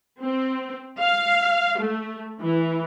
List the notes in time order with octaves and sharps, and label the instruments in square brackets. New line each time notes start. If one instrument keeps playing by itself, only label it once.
[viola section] C4
F5
A3
E3